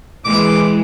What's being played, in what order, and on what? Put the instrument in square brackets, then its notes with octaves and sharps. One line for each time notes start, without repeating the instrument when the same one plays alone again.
[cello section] E3 G#3 [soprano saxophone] D6